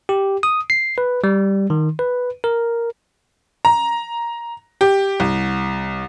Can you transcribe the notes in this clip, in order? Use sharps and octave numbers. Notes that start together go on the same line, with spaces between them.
G4
D#6
C7
B4
G3
D#3
B4
A#4
A#5
G4
C2